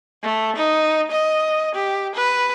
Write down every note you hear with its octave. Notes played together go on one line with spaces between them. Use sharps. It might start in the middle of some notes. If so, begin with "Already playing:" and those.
A3
D#4
D#5
G4
B4